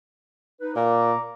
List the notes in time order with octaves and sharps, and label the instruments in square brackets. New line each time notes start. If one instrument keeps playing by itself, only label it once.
[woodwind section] D#4 B4
[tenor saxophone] A#2 [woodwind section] A#5 D6